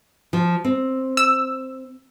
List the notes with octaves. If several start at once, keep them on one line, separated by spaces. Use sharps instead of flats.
F3
C4
E6